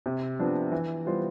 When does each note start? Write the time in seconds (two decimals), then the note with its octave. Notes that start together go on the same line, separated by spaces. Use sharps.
0.06 C3
0.39 F3 B3 D4
0.72 E3
1.06 G3 B3 F4 C5